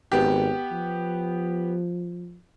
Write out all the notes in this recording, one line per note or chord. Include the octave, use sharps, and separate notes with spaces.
G#1 B3 G4
F3